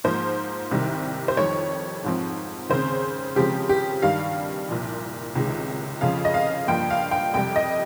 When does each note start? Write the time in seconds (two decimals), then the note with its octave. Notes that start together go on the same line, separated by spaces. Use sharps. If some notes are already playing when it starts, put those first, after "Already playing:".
0.04 G#2 F3 A#3 C5
0.71 C2 C3 D#3 G3
1.28 C5
1.37 F2 D#3 G3 C#5
2.04 G#2 F3 C4
2.70 D#2 C#3 G#3 C4 C5
3.36 C#2 C#3 F3 G#3 C4 G4
3.69 G4
4.02 G2 D#3 G3 F5
4.69 C2 A#2 F3
5.35 C#2 C3 D#3 G#3
6.01 F2 C#3 F3 F5
6.25 D#5
6.34 F5
6.68 G2 F3 A#3 G5
6.90 F5
7.11 G5
7.34 F2 C3 G3 G5
7.56 D#5